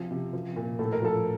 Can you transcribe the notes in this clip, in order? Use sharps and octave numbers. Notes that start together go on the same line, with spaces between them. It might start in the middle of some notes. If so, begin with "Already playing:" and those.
Already playing: C3 F3
C3
F3
A#2
A2 A4
A#4
F3 A4